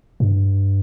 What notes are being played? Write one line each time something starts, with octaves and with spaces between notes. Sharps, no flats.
G2